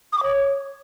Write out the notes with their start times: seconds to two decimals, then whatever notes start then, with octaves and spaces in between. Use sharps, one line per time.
0.13 D#6
0.18 D6
0.23 C#5